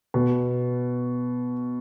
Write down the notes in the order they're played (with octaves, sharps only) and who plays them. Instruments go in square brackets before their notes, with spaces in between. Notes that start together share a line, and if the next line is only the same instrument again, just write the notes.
[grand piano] B2